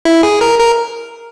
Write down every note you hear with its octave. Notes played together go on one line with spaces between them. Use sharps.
E4
G#4
A#4
A#4